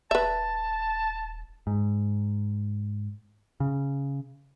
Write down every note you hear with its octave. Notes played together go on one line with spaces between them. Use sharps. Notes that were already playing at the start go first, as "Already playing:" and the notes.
D#1 B4 E5 A5
G#2
C#3